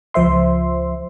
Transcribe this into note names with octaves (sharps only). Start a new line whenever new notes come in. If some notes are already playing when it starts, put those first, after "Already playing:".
C#2 F3 C5 E5 C6